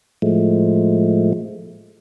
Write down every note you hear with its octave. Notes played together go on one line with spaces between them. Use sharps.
A2 F3 G#3 A3